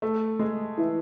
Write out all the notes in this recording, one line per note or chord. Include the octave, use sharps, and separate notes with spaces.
A3 A4
G#3 G#4
E3 E4